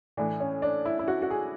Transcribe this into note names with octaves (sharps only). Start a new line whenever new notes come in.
A2 E3 D4
C#4
D4
E4
E4
F#4
F#4
G#4